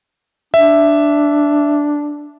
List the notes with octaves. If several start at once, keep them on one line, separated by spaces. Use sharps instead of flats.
D4 E5